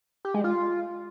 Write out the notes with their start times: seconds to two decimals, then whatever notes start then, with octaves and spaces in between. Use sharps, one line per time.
0.25 G4
0.34 G#3
0.44 F4